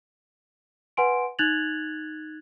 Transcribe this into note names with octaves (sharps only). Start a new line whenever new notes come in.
B4 F#5 G#5 C6 D7
D#4 F#6 G#6 A6 F7 F#7